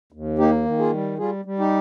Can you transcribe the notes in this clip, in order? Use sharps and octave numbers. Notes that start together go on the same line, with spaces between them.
D#2
A#3 D#4 G4
D#3
F4 G#4
G3
G3 F4 G#4
G3
D#4 G4